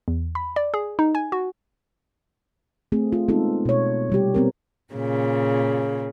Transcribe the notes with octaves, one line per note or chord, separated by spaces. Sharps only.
E2
B5
D5
G#4
D#4
G#5
F#4
A3 C4 G#4
F4
G#3 B3 C4 D#4 F4 A4
B2 C#5
C3 G3 G4
B3 C4 A#4
A#2 C#3